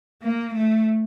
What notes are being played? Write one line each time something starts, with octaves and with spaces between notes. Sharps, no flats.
A#3
A3